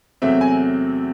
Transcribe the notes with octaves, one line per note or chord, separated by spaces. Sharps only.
E2 C3 F#3 A3 C4 E5
G#5